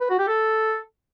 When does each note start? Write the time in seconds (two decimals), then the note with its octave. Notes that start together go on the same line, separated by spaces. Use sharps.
0.01 B4
0.10 F#4
0.19 G4
0.28 A4